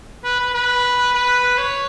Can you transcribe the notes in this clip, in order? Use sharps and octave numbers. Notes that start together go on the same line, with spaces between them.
B4
B4
B4
B4
C#5